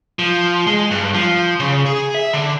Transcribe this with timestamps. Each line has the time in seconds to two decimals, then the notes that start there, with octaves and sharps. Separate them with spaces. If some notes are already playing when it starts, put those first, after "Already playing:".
0.19 F3
0.67 G#3
0.91 G2
1.14 F3
1.60 C#3
1.86 G#4
2.15 E5
2.33 D3